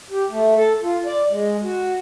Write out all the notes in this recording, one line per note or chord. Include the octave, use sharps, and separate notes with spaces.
G4
A3
A4
F4
D5
G#3
F#4